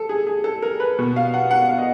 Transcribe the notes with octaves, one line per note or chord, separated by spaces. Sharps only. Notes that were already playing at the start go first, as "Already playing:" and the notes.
Already playing: A4
G#4
G#4
A4
A#4
B4
B2
F5
F#5
F#5
F5
D#5